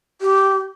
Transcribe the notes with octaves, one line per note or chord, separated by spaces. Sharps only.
G4